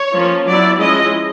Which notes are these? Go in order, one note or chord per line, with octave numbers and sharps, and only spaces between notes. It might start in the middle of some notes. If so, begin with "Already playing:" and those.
Already playing: C#5
F3 A#3 C#4
F#3 B3 E4 D5
F3 G#3 C#4 E4 D#5